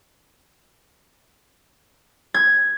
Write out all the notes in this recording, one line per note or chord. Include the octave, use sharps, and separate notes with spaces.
G#6